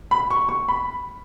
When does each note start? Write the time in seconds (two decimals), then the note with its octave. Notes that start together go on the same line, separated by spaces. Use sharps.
0.11 B5
0.30 C#6
0.49 C#6
0.68 B5